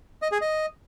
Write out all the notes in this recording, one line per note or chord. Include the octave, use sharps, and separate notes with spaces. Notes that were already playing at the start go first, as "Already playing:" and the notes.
D#5
G#4
D#5